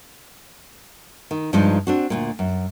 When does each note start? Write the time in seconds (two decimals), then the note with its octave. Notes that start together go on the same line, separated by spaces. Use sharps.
1.31 D#3
1.53 G2 F3 G#3 D4 D#4
1.87 C4 D4 F#4
2.10 D2 G2 A#2
2.39 F#2